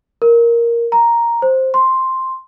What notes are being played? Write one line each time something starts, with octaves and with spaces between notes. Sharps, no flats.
A#4
A#5
C5
C6